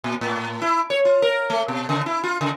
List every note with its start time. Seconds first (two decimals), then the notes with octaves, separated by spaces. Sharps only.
0.04 A#2
0.21 A2
0.62 E4
0.90 C#5
1.05 F4
1.22 A#4
1.50 A3
1.68 B2
1.89 C#3
2.06 E4
2.24 F4
2.41 C#3